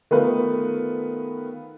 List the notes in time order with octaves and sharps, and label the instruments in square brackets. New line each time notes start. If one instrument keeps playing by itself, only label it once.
[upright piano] D#3 A3 B3 F4 A#4 B4